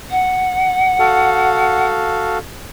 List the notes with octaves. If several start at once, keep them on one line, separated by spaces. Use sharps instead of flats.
F#5
F#4 A4 F5